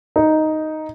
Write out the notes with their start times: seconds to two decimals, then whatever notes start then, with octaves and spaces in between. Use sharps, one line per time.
0.16 D#4